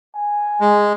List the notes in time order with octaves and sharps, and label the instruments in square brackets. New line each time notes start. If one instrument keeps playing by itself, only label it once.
[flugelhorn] G#5
[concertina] G#3